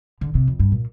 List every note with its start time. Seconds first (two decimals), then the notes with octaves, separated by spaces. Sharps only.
0.21 D3
0.35 C3
0.48 F2
0.59 G2
0.72 A#2